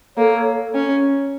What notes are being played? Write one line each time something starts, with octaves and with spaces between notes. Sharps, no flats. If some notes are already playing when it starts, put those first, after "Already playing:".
A#3 A4 C#5
C#4